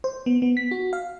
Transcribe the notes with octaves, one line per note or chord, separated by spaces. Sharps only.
C5
B3
B3
B6
F#4
F5